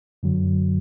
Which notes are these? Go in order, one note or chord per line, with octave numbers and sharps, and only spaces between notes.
F#2 D3 F#3